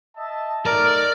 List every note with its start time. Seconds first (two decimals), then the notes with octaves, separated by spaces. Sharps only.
0.16 D#5 E5 A5
0.66 A3 D#4 A#4 D5 F6